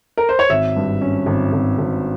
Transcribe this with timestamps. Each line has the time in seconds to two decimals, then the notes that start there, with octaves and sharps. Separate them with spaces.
0.17 A#4
0.29 C5
0.39 C#5
0.49 G#1 E5
0.76 G2
1.01 C#4
1.26 G#1
1.52 G#1
1.78 G#1